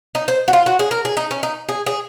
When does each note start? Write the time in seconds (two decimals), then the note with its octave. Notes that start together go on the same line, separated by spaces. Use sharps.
0.15 D#4
0.28 C5
0.48 F#4
0.53 F4
0.66 F#4
0.79 G#4
0.91 A#4
1.05 G#4
1.17 D#4
1.31 C#4
1.43 D#4
1.69 G#4
1.86 G#4